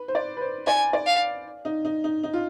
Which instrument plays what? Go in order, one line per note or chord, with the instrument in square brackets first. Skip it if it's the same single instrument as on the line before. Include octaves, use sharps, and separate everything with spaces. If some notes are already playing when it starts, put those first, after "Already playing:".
Already playing: [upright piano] B4
C5
D5
B4
C5
[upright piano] D5 [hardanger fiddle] G#5
[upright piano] D5
[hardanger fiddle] F5
[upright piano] D#4
D#4
D#4
D#4
F4